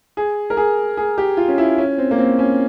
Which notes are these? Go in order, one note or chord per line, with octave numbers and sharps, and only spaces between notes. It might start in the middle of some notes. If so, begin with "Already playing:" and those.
G#4
A#4
G#4
G#4
G4
F4
C#4
E4
C#4
C4
A#3
C4
C#4